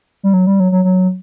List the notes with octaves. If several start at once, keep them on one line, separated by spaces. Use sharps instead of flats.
G3
F#3
G3
F#3
F#3
F#3